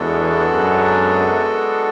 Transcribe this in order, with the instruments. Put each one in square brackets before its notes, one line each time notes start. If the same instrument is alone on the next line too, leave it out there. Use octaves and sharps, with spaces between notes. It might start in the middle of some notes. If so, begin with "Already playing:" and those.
Already playing: [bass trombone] E2 [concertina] G#3 B3 D4 F#4 A4
[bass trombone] F#2